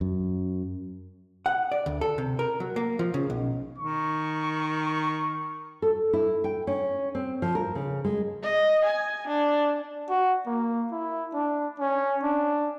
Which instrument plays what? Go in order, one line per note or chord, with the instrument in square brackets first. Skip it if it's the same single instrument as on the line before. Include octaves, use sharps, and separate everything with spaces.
[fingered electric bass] F#2
[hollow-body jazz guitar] F#5
D5
D2
A4
C3
A#4
F#3
A#3
F3
C#3
B1
[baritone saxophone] D#3 [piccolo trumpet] C#6
[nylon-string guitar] A4
E4
G5
C#4
C4
F3
A#4
C#3
G#3
[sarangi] D#5
G#5
D4
[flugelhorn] F#4
A#3
E4
D4
C#4
D4